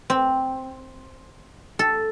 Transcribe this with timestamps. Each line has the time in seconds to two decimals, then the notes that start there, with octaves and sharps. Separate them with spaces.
0.10 C4
1.79 A4